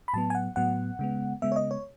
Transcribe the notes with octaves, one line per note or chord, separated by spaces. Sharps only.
B5
A2 F#3 B3 A5
G#5
F#5
A2 F#3 B3 F#5
C#3 G#3 B3
C#3 G#3 B3 E5
C#5
D#5
C#5